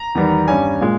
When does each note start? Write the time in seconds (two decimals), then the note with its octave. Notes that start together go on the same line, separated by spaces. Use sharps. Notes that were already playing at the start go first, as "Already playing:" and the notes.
Already playing: A#5
0.15 E2 D#3 G3 B3
0.48 G2 G3 C#4 G#5
0.81 A#2 G#3